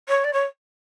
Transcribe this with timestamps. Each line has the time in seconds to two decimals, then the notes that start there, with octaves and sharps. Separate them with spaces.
0.08 C#5
0.24 D5
0.33 C#5